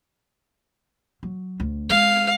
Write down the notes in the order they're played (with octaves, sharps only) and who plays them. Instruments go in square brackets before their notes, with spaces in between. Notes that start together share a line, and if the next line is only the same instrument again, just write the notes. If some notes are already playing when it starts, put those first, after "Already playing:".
[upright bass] F#3
D2
[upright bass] G#3 [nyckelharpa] F5